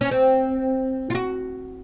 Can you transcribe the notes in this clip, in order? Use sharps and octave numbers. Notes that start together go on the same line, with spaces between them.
C#4
C4
F4
F#4